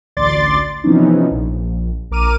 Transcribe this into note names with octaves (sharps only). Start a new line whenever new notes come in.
A1 D2 D5 C6 D6 A6
C3 E3 F3 B3 C#4 D#4
A#1
A#1 A#4 D6 F6 D#7